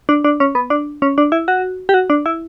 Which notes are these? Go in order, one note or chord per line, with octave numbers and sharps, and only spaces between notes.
D4
D4
C#4
B3
D4
C#4
D4
E4
F#4
G4
F#4
D4
E4